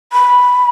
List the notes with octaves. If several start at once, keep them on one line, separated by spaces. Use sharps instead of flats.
B5